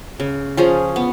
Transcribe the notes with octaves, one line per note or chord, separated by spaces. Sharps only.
C#3
F3 C#4 G#4
B3